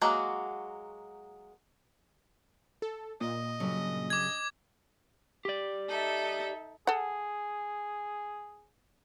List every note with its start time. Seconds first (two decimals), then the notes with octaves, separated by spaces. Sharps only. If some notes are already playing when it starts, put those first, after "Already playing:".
0.01 F#3 G#3 A#3 F#4 A#5
2.82 A4
3.21 A#2 D#5
3.60 G2 C#3 F#3
4.10 D6 G#6
5.45 G4 D5
5.87 D#4 A4 E5
6.87 G#4 A4 F#5